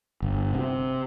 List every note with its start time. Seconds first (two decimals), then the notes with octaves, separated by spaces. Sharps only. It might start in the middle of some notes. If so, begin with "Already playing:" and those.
0.22 G1
0.54 C3